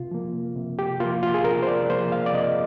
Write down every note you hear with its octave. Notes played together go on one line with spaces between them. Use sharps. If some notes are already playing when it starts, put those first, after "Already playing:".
Already playing: C3 F4
F3 A#3
C3
G4
F3 A#3 F4
F4
G#4
C3 A#4
C5
D5
F3 A#3 C5
F5
D5
C3 D#5